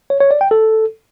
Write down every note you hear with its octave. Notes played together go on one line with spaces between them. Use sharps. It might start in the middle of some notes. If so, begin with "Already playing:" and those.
C#5
C#5
D5
G5
A4